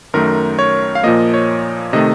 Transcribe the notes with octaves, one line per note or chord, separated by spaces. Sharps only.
F#2 D#3 A3 A#4
C#5
F5
A#2 F3 A#3 D#5
C#5
C3 D#3 A3 D#5